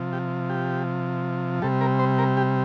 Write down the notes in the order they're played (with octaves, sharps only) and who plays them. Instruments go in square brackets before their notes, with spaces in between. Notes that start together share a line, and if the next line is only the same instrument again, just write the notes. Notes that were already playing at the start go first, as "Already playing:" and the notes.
Already playing: [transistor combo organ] C3 F3
G4
G4
C3 G3 A4
A#4
C5
A#4
G4